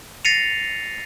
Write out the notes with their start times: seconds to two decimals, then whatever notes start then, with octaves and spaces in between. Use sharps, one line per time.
0.25 A6 A#6 C7 C#7 D#7 F7